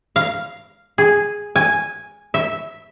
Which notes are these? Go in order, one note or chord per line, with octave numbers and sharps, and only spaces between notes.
F5
G#4
G#5
E5